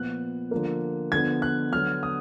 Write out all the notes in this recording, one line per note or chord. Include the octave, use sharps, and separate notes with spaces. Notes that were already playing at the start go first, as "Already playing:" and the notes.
Already playing: A#2 F3 B3 F#6
D3 F3 A#3
D3 F3 B3 G#6
F#6
D3 F#3 B3 F6
D#6